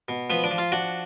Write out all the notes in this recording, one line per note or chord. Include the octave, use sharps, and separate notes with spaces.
B2
F3 B3 B4
D4 D5
F3
F4 F5
D4 F#4 F#5